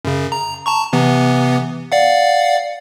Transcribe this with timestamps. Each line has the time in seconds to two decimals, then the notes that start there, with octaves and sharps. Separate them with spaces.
0.05 F#2 C#3
0.32 A#5
0.66 A5 A#5 C#6
0.93 C3 E3 B3
1.92 D5 F5 F#5